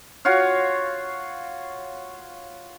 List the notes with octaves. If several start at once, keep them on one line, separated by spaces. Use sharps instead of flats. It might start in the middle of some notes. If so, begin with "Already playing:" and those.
F4 F#4 C#5 F5